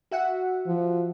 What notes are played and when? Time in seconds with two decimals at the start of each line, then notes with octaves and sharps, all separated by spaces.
0.11 F#4 E5 F#5
0.68 F3